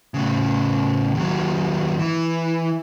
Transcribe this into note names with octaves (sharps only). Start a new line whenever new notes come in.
A2 C#3
D#2 F#3
E3